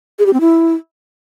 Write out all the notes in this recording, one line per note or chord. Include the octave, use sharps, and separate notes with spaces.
G#4
G4
C4
E4